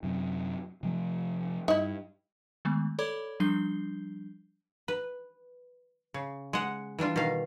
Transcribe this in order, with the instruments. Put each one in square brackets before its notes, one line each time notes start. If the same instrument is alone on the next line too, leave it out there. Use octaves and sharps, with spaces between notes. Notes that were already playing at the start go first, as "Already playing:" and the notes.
[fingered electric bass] F#2 C3
C3 F3 A3
[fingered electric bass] G2 [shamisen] D#4 E4
[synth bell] D#3 G#3 A3 B3
A4 C#5 D5 B5 D6 G#6
F3 G3 D4 G6 C7 G7
[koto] B4
C#3
G#3 F#5
E3 G3 D4 F4
B2 D#3 G4 F5